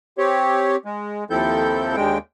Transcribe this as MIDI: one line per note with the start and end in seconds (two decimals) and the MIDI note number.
0.18 0.76 60
0.18 0.76 67
0.18 0.76 73
0.85 1.24 56
1.30 1.96 39
1.30 1.96 53
1.30 1.96 60
1.30 1.96 64
1.30 1.96 69
1.30 1.96 91
1.96 2.18 39
1.96 2.18 50
1.96 2.18 56
1.96 2.18 79